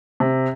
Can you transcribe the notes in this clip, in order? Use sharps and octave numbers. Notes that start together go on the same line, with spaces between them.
C3